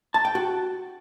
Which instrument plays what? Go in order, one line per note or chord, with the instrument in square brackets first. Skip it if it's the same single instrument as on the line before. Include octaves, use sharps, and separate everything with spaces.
[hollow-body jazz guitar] A5
G5
F#4